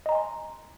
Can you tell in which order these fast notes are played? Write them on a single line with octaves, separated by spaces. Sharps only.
D#5 A#5 G#5 C6